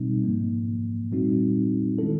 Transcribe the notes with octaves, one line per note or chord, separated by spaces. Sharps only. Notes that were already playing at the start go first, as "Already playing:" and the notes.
Already playing: B2 G3 C4 D#4
G#2 F3 A#3
A#2 G3 C4 D#4 F#4
D#3 G#3 C#4 E4 A4